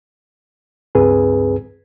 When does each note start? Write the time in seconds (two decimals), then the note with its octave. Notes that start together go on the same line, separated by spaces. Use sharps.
0.95 C#2 G2 C4 G#4 B4